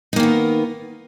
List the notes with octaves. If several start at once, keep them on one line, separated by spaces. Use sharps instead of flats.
D#3 A#3 B3 D#4